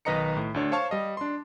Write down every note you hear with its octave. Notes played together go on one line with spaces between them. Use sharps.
B1 D#3 B4 D#5 A#5 C#7
A2
D2 D4 C#5
C5 C#5 F5 A5 C#6
G3 D#5
D4 C6